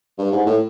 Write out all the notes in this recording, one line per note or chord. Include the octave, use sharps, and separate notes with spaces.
G2
G#2
A2